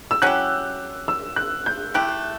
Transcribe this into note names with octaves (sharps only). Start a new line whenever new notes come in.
E6
F#3 C#4 E4 G4 F#6
E6
F#6
G6
A3 E4 G4 F#6